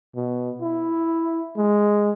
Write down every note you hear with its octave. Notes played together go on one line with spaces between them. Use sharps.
B2
E4
G#3